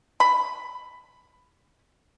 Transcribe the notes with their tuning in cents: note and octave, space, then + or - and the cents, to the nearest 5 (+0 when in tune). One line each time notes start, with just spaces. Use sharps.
B5 +10